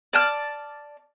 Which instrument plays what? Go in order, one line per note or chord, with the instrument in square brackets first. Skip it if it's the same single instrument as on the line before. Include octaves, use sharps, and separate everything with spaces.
[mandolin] D5 A5 F6